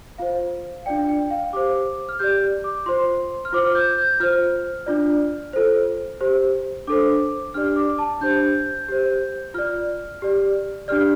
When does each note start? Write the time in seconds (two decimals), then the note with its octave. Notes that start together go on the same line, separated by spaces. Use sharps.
0.18 F4 C5 F5
0.86 D4 F4 D5 G5
1.09 G5
1.31 F5
1.53 G4 C5 D6
2.09 F6
2.19 G4 D5 G6
2.64 D6
2.86 F4 C5 C6
3.45 F6
3.53 F4 C5 D6
3.65 F6
3.75 G6
3.98 G6
4.20 F4 C5 F6
4.86 D4 F4 D5
5.53 F4 A4 C5
6.21 G4 C5
6.87 D4 A4 C5 D6
7.54 D4 G4 D5 F6
7.76 D6
7.99 A5
8.21 D4 G4 C5 G6
8.88 G4 C5
9.54 F4 D5 F6
10.22 G4 D5
10.88 D4 G4 D5 F6